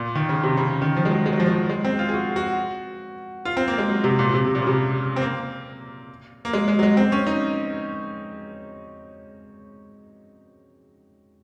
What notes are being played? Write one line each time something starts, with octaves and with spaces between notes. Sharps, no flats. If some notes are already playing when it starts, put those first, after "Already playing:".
Already playing: A#2
D#3
C#3
C3
C#3
D#3
F3
G#3
F#3
G#3
F#3
F3
F#3
G#3
C4
F4
G#4
F#4
F#4
F4
C4
A#3
G#3
F#3
C3
A#2
C3
C3
A#2
C#3
C3
C4
A#3
A#3
G#3
G#3
F#3
G#3
C4
C#4
D#4